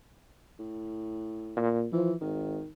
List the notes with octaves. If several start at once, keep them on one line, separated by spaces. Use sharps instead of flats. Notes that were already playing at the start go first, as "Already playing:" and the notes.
A2
A#2
E3 F3
G#1 D#3